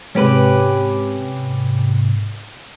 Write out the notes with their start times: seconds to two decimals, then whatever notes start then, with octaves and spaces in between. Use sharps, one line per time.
0.15 G#2 C3 C#4 G4 B4